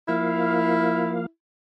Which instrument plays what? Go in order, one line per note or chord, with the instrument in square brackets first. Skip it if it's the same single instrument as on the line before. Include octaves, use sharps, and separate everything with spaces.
[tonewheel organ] F3 A#3 F5 [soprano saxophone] E4